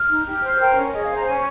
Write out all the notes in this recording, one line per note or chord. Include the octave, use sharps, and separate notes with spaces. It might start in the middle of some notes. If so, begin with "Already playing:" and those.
Already playing: F6
D#4
G4
C5
A#4 G5
C#4
G#4 D#5
F5
C5
A#5
C#4 G#5